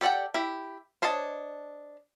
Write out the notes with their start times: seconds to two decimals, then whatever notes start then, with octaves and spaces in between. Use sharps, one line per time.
0.01 G4 A4 D5 F#5 G5
0.34 E4 G4
1.02 D4 C5 C#5 D#5 A5